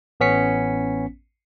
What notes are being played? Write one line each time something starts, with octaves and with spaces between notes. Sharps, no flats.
A1 B3 C#4 B6 C#7